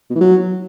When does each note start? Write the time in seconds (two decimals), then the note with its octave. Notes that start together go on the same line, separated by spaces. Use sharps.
0.10 B2
0.15 E3
0.21 F#3